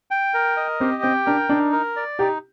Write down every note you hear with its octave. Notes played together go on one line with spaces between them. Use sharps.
G5
A#4
D#5
C4 G4
C4 G5
D4 A#4
D4 D#4
A#4
D5
D#4 G4